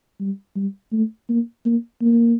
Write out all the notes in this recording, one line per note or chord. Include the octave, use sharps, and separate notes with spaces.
G3
G3
A3
A#3
A#3
A#3